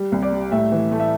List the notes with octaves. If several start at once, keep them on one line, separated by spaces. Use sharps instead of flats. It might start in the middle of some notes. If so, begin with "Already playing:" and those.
Already playing: G3
C2
D5
G3
A2 E5
E3
A3
E5